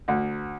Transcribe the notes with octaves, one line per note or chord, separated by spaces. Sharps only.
D2